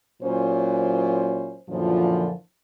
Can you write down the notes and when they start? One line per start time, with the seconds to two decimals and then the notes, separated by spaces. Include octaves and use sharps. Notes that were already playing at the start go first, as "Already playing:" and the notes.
0.22 A#2 F#3 C#4 E4 C5
1.69 F#2 A#2 D3 E3 F3